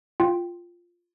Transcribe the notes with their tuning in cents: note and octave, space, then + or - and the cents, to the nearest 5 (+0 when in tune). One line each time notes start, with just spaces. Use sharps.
F4 +0 G5 +0